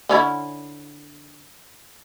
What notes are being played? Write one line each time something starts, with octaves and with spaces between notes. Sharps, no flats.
D3 C#4 E4